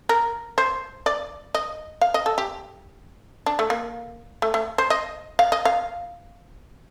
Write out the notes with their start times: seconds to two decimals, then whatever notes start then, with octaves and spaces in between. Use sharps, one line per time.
0.09 A#4
0.58 C5
1.06 D5
1.55 D#5
2.01 F5
2.14 D#5
2.26 A4
2.38 G4
3.46 D4
3.59 A3
3.70 A#3
4.42 A3
4.54 A3
4.78 C5
4.90 D#5
5.39 F5
5.52 D#5
5.65 F5